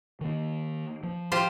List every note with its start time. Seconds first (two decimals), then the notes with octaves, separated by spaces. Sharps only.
0.21 D#3 A#3
1.03 F3
1.32 F4 G4 C5